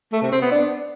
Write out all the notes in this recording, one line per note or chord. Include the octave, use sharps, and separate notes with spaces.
A3
C3
C4
B3
D4